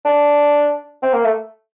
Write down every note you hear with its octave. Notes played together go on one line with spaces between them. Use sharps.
D4
C4
A#3
A3